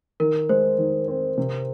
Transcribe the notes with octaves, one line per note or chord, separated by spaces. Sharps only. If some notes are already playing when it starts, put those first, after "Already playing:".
D#3 A#4
G#3 C5
D#3
C4
C3